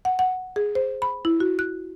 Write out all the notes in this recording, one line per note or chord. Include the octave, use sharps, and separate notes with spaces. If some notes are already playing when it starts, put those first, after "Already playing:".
F#5
F#5
G#4
C5
B5
E4
F#4
F#6